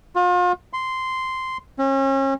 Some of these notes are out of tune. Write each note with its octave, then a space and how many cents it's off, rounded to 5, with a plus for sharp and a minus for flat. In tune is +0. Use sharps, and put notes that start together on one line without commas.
F4 +40
C6 -10
C#4 -35